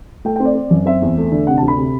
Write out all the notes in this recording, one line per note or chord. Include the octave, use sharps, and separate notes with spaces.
A3 G5
C4 G5
D5
C4
F#2
C4 E5
E2
A3
D3
C3 F#5
A5
D2
B5
C3